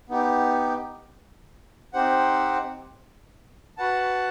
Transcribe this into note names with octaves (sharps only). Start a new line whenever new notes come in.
B3 D#4 G4
C4 D#4 G4 C5 F#5
F#4 B4 F#5 A5